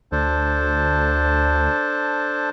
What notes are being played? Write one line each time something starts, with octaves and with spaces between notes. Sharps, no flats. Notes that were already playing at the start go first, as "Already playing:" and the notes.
D2 D4 A4 C5